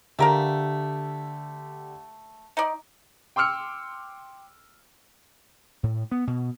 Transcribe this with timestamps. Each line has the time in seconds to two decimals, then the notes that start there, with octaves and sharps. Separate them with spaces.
0.19 D3 A3 G4 A#4 F5
2.57 D#4 D5
3.36 G5 C6 D6 E6 F6 C#7
5.83 A2
6.11 B3
6.27 B2